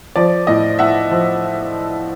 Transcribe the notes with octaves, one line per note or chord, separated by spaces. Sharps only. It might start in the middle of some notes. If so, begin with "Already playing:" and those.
F3 D5
A2 D#5
A2 E5 F#5
F3